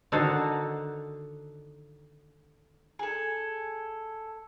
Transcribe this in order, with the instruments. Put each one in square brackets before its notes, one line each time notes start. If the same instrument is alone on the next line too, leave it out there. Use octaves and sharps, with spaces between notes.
[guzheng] D3 D#3 D#4 F#4 A4 C5
[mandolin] G#4 A4